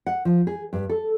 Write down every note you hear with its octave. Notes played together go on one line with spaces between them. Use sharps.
F#5
F3
G#4
G2
A4